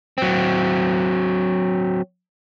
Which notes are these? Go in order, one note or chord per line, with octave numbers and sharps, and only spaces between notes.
F#3 C4